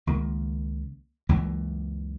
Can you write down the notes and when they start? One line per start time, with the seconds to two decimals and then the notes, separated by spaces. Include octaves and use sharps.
0.07 C#2 D#3 A#3
1.29 C#2 F#2 E3 A#3